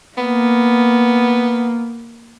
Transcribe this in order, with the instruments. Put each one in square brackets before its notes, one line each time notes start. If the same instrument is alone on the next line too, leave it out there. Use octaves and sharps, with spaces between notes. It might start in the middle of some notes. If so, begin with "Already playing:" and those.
[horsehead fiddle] A#3 [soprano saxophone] B3